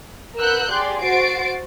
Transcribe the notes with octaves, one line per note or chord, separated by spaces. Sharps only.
A#4 B4 F#5 E6 F#6 G6
G4 G#4 D5 C6
F#4 C5 A6 C7 D7